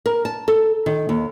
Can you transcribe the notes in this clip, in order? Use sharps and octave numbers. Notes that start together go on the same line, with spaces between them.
A#4
A5
A4
D#3
D#2